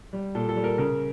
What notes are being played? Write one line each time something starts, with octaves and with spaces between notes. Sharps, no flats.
G3
A#2 A4
A4
G3
A#4
C#3 A#4